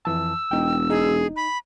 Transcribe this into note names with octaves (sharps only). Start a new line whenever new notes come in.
F2 E3 A5 E6
E1 D#4 G5
D#4 G#4
B5